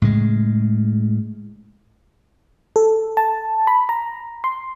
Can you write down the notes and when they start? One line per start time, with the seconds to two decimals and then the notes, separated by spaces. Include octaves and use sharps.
0.02 A2 C#3 G#3
2.76 A4
3.17 A5
3.67 B5
3.89 A#5
4.44 C6